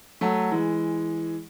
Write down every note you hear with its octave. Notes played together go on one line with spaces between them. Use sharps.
F#3 A3
E3 G#3